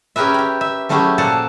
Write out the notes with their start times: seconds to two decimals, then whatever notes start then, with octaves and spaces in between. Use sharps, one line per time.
0.16 C#4 G4 G#4 A#4 B4 E5
0.34 G4 G5
0.61 E5
0.89 F#3 A3 C#4 E4 G4 G#4
1.18 A#2 F3 A#3 A4 F#5 A5